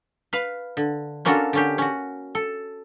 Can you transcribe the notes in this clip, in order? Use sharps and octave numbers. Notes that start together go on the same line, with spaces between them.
B4 F5
D3
A#3 C#4 D4 F4 F#4 A4
D3 C#4 G4
C#4 F#4
A4